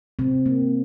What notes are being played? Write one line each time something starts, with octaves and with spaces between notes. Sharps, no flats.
C3 C4
A#3